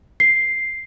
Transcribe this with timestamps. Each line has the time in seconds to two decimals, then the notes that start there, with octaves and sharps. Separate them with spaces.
0.20 C7